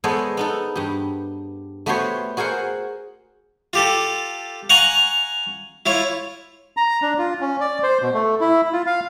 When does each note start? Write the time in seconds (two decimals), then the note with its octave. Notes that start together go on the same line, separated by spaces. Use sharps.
0.04 G#3 B3 A4 C5 C#5 D#5
0.37 B3 D#4 A4
0.75 G2 G4
1.86 A3 B3 F#4 G4 C5 C#5
2.37 F#4 G#4 A#4 C5 F#5 G5
3.73 F4 G4 A4
4.70 F5 F#5 G#5 A#5 C#6
5.86 E4 F4 C#5
6.77 A#5
7.02 D4
7.18 F4
7.41 C#4
7.61 D5
7.83 C5
8.02 B2
8.14 A3
8.40 E4
8.73 F4
8.86 F5